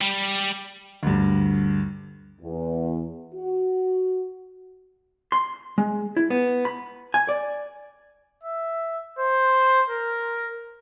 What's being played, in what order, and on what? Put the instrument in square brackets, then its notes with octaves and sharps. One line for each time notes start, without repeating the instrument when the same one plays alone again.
[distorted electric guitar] G3
[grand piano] D2 G2
[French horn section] E2
F#4
[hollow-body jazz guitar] C6
G#3
E4
B3
B5
G#5
D5
[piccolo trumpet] E5
C5
A#4